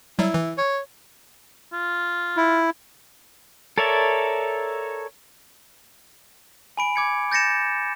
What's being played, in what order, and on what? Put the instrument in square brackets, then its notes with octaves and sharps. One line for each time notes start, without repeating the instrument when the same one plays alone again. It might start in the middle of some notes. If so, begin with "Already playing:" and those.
[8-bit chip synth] F#3 G3 [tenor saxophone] E4
[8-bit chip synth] E3
[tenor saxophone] C#5
[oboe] F4
[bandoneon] E4
[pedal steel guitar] A4 A#4 C#5 D5 E5
[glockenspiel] G#5 B5 D7
D6 G#6 C#7
G6 A6 A#6 C#7 E7